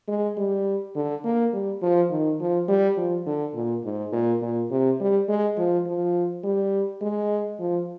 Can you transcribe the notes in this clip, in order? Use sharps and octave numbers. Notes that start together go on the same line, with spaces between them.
G#3
G3
D3
A#3
G3
F3
D#3
F3
G3
F3
D3
A#2
G#2
A#2
A#2
C3
G3
G#3
F3
F3
G3
G#3
F3